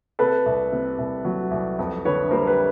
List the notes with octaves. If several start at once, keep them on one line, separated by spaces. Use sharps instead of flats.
C3 A4 B4
C2
C3
C2
F#3
C2
F2
D3 B4 C#5
G3 A#4 C5
B4